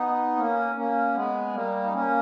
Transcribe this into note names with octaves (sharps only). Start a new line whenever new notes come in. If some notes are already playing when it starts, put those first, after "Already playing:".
Already playing: B3 D#4
A#3 C#4
A#3 C#4
G#3 B3
G3 A#3
D#4
A#3 C#4